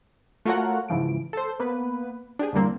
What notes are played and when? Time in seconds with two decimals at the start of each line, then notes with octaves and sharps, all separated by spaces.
0.45 A3 F4 F#4 A#4 C#5 F#5
0.89 G#2 C#3 E3 F3 D7
1.33 A4 C5
1.60 A#3 B3 B4
2.39 D4 G4 G#4
2.53 E2 G2 D3 G3 A#3 C4